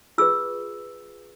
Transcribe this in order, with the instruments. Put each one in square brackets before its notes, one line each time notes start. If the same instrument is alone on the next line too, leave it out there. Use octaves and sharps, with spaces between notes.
[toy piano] F4 G#4 B4 E6